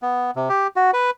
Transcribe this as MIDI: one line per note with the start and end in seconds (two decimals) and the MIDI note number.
0.02 0.31 59
0.36 0.49 48
0.49 0.67 67
0.76 0.91 66
0.94 1.10 71